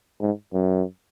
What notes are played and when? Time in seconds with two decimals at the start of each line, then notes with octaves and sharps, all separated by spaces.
0.21 G#2
0.53 F#2